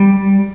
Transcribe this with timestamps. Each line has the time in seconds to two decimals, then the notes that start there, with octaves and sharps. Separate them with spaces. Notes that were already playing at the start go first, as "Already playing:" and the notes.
Already playing: G3